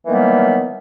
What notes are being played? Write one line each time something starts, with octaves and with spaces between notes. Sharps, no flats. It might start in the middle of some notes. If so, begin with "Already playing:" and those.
D#3 E3 F#3 G3 A#3 B3